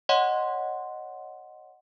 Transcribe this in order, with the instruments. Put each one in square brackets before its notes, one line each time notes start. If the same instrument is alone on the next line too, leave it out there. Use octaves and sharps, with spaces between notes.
[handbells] C#5 D#5 F#5 C6